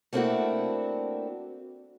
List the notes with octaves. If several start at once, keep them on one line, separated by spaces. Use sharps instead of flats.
A3 A#3 C4 D4 E4 F#4